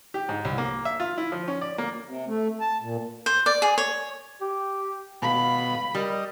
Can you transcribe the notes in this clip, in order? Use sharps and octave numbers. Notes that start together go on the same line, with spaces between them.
G4
G#2
C2
A#3
E5
F4
E4
F3
C#4
D5
A#3
C3
A3
A5
A#2
C5
D5
G#4
C#5
G4
B2 F5 B5
G3 A#4 D#5